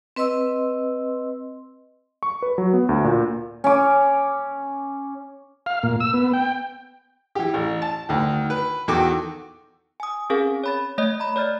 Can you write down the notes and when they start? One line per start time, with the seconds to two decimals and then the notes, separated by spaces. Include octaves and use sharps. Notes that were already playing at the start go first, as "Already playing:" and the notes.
0.16 C4 B4 D#5 C6 E6
2.23 C#6
2.42 B4
2.58 F#3
2.73 B3
2.89 D2
3.04 A#2
3.64 C#4 D6
5.66 F5
5.83 A#2
6.00 E6
6.14 B3
6.33 G5
7.35 E3 G4
7.54 A1
7.82 A5
8.09 D2 D#3
8.50 B4
8.88 E2 D#3 F#4 A4 G5 D6
10.00 G#5 D#6
10.30 C4 C#4 G#4 A#4 F5 G#5
10.64 C#5 B5 A6
10.98 A3 C#5 D#5
11.20 A#5 B5
11.36 C#5 D5 F6 A6